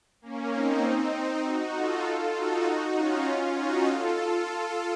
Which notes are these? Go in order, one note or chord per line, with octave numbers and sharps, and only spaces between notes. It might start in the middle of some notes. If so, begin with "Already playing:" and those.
A#3 C#4
C4 D#4
C4 D#4
D#4 F#4
F4 A4
D#4 F#4
C#4 F4
D#4 F#4
F4 A4